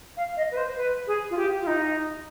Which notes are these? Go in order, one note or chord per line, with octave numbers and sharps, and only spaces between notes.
F5
D#5
B4
C5
B4
G#4
F4
G4
F4
D#4